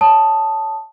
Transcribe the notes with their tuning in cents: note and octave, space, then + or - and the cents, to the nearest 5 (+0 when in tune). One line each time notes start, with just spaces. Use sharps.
C#5 +20 A5 +0 D#6 +0